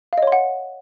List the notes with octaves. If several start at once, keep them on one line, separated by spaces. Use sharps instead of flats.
C#5 D#5 F5 F#5 C6